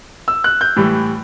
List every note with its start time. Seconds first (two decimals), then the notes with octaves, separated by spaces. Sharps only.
0.28 E6
0.44 F#6
0.61 G6
0.77 A2 E3 G3